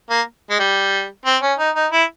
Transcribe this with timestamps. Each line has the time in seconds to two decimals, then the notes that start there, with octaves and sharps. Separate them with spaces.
0.10 A#3
0.50 G#3
0.59 G3
1.26 C4
1.42 C#4
1.59 D#4
1.75 D#4
1.92 E4